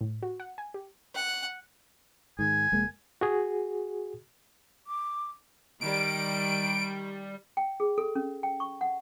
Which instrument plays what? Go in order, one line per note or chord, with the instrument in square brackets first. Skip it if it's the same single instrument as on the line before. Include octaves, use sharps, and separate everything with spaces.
[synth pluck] A2
F#4
F#5
G#5
G4
[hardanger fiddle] F#5
[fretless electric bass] G#2 D#3 [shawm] G#5
[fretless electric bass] F1 G#3 A#3
[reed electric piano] F#4 G#4
[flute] D6
[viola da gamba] D#3 [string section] G3 [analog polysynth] D7
[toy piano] G5
G#4
A4
C#4
G5
C#6
F#5